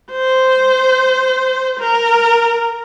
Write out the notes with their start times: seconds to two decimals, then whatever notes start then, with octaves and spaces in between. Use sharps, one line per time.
0.12 C5
1.80 A#4